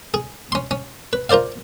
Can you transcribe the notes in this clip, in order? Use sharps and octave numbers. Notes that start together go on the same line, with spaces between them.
G#4
C#4 C6
C#4
B4
F4 A#4 C5 D5 F5